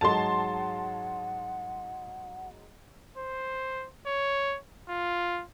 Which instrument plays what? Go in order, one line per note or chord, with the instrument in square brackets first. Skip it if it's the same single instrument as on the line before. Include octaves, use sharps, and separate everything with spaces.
[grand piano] G#2 F#3 G#3 [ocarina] F#5 [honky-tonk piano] A5 C6
[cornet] C5
C#5
F4